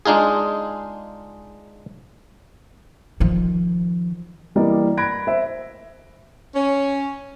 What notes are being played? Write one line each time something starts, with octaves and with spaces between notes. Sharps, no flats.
G#3 D4 D#4 F4 G#4
D#3 F3
E3 G3 A#3 D5 D#5
B5 F#6 G#6 A#6 D7
C5 E5
C#4